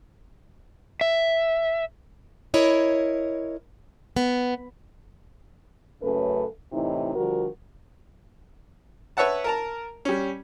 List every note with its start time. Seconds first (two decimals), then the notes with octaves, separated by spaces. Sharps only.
1.01 E5
2.54 E4 A#4 C#5 D#5
4.16 B3
6.02 F#2 C#3 A3 A4 B4
6.72 A2 C3 E3 D#4
7.15 D3 F3 G3 F#4 A#4
9.17 B4 C#5 E5 F#5 A5
9.44 A#4 A5 A#5
10.05 G3 C#4